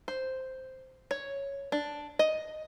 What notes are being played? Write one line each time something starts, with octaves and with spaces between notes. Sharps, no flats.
C5
C#5
D4
D#5